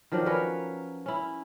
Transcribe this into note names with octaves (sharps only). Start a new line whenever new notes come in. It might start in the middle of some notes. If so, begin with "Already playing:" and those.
D#3 F3 F#3 D4
C#4 A#4 B4 C#5
C#4 E4